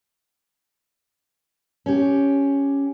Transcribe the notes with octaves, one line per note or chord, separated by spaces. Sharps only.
C#4 G4